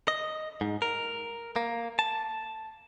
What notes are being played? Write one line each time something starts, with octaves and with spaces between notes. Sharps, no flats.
D#5
G#2
A#4
A#3
A5